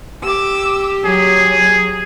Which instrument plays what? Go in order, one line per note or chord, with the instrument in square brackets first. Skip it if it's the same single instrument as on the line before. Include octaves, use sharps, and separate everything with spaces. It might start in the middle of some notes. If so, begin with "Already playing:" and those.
[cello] G4 [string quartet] D6 E6
[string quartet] F#3 [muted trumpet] G#4